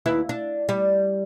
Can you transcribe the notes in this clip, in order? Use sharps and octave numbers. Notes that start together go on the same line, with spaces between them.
D#2 E4 B4
D4
G3